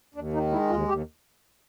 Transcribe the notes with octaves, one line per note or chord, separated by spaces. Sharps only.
D#2 D4
D#3 D#4
G#3 E4
D#2 F4
D#2 G4